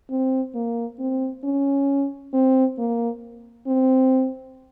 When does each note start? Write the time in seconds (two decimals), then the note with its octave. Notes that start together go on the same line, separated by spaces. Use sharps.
0.10 C4
0.55 A#3
0.99 C4
1.44 C#4
2.34 C4
2.79 A#3
3.67 C4